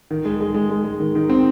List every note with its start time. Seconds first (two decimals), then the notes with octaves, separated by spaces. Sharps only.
0.11 D#3
0.25 G#3
0.40 G#3
0.55 G#3
0.70 G#3
0.84 G#3
1.00 D#3
1.15 D#3
1.29 C4